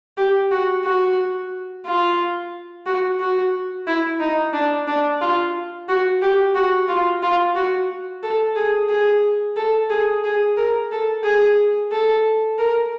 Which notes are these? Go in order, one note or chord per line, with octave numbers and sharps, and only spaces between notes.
G4
F#4
F#4
F4
F#4
F#4
E4
D#4
D4
D4
F4
F#4
G4
F#4
F4
F4
F#4
A4
G#4
G#4
A4
G#4
G#4
A#4
A4
G#4
A4
A#4